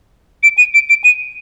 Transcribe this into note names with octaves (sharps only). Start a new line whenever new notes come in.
D7
D#7
D7
D7
D#7